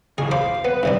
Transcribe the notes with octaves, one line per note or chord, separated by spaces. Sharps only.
C#3 E3 F#3 G#4
C5 F5 B5 D6
B3 B4
G2 C3 D4